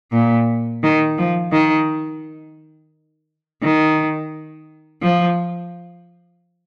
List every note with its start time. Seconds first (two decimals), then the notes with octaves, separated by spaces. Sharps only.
0.13 A#2
0.83 D#3
1.18 F3
1.52 D#3
3.63 D#3
5.03 F3